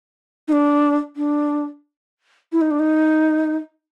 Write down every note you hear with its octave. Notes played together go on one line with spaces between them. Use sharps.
D#4
D4
D4
E4
D#4
D4
D#4